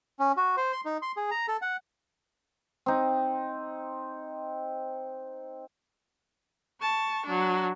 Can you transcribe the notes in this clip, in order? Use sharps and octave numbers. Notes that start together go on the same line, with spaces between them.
C#4
F#4
C5
C6
D#4
C6
G#4
A#5
A4
F#5
C4 D#4
A5 C#6
F#3 D4